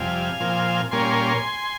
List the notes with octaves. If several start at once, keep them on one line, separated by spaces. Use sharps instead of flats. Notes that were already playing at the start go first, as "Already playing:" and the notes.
Already playing: F2 C3 G3 F5 G#5
A#2 F3 C4
A#2 G3 A#3 C#4 G#5 C6